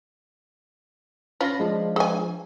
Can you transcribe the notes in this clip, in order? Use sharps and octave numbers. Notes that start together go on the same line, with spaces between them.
C#4 F4 F5 B5 A#6
F3 G#3 D4
G#4 G#5